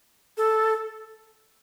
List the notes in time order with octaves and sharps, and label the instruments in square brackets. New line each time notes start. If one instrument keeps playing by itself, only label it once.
[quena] A4